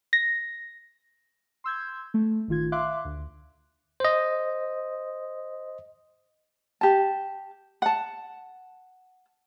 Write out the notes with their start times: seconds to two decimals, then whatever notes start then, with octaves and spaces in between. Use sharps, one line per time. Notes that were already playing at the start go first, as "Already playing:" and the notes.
0.13 A#6
1.64 C6 E6 G6 G#6
2.14 A3
2.48 A1 D#3 F4 G#6
2.72 E5 F5 C6 D6 F#6
3.05 D2
4.00 C5 D#5
6.81 G4 A5
7.82 F#5 A5